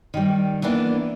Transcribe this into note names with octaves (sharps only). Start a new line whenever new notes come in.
D#3 G3
E3 A#3 B3 D4